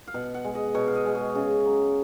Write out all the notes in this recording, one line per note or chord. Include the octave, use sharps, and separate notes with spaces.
F5
B2 F#5
F#5
G#3
D#5
B2 C#5
F5
D#5
G#3
C#5
C#3
F#3